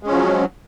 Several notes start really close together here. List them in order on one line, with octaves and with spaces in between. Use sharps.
G#3 C#4 F3 F#3